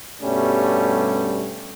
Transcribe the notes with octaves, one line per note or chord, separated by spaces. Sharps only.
G2 B2 G3 A3 C#4